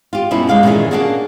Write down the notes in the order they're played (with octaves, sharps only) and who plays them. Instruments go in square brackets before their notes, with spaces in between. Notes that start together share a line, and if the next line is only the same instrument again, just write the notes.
[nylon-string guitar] F4 G4
G2 B2 A#3 C#4 E4
G#3 F5
A#2 D#3 E3 C#4 G#4
A#3 C#4 D4 F#4 G#4